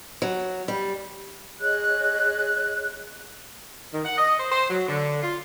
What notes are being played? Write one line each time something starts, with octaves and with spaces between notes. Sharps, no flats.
F#3
G3
G#4 C#5 D#5 F#6
D#3
F#5
D#5
C5
C5
F#3
D3
F4